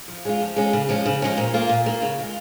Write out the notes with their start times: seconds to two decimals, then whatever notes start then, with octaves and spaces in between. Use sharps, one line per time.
0.08 F3
0.25 G#3 C#4 F4
0.41 F3
0.56 G#3 C#4 F4
0.73 C#3
0.89 F3 G#3 C#4
1.06 C#3
1.22 F3 G#3 C#4
1.38 A#2
1.54 A#3 F4
1.69 A#2
1.86 A#3 F4
2.02 C#3
2.19 G#3 F4